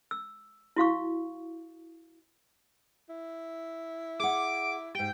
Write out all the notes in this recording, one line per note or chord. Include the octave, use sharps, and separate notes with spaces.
E6
E4 F#4 F5 C#6
E4
G#4 F#5 D6
G#2 G4 G5